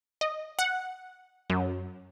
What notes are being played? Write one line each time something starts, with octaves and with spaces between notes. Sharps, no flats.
D#5
F#5
F#2